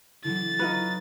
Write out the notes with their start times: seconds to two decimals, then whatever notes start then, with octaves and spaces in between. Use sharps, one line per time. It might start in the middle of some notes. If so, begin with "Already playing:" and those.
0.24 D3 E3 F#3 E4 A6
0.59 D#4 F4 B4 C#6 A#6 D#7